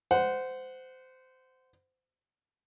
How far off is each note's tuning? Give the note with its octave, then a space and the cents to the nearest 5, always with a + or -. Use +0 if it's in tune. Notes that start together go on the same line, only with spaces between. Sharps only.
C5 -20 F#5 +0